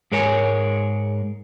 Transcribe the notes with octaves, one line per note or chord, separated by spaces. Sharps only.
G#2 G#3 A#4 C#5 G#5